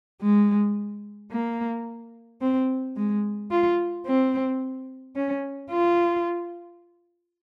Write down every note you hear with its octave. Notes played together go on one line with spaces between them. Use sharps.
G#3
A#3
C4
G#3
F4
C4
C#4
F4